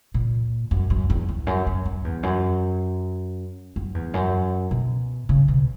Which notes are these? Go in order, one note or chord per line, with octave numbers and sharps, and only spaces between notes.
A#2
F#2
F#2
E2
E2
F#2
F#2
F#2
E2
F#2
F#2
E2
F#2
B2
C#3
B2